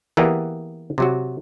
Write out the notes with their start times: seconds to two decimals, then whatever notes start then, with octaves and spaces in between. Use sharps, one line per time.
0.17 E3 A#3 B3 G4 G#4 D5
0.98 C3 F#3 F#4